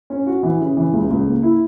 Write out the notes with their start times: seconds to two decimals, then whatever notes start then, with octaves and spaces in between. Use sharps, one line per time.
0.10 C#4
0.27 F#4
0.43 E3
0.60 C#3
0.77 E3
0.93 C#2
1.10 C#2
1.27 A#3
1.43 E4